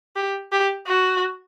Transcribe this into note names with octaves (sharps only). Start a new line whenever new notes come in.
G4
G4
F#4